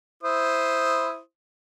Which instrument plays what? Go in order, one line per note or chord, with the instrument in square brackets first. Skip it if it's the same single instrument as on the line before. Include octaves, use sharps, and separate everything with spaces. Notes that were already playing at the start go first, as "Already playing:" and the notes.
[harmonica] E4 C5 D#6